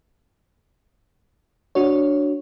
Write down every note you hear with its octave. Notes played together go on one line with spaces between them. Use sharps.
D4 F#4 C#5